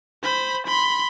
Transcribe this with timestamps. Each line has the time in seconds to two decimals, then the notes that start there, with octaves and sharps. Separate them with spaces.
0.23 C5 B5
0.67 B5 C6